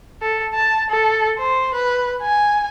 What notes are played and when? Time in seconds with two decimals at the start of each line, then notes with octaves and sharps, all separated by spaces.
0.22 A4
0.54 A5
0.90 A4
1.38 C5
1.74 B4
2.22 G#5